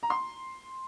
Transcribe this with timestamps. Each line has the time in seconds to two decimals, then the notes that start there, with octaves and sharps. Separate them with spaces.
0.03 A#5
0.10 C6